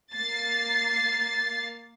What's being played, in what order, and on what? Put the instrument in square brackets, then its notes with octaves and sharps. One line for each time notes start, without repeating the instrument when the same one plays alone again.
[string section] A#3 A6 C7